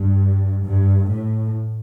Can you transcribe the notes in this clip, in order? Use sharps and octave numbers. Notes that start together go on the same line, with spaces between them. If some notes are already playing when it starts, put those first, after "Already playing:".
Already playing: G2
G2
A2